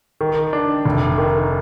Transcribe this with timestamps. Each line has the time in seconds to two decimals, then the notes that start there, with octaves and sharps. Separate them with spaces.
0.21 D#3
0.53 D4
0.85 F1
1.18 D#3